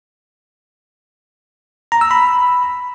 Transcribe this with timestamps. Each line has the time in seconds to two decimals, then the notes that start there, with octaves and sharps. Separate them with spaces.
1.92 A#5
2.01 E6
2.11 B5